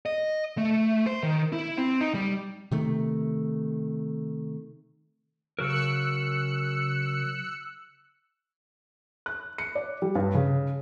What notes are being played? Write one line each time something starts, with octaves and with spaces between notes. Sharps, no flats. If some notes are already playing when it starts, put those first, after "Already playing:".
D#5
A3
C5
D#3
E4
C4
D#4
G3
C3 D#3 A3
C#3 F#3 A#4 E6 F#6 C#7
F#6
C#7
D5
G3
G2
C#3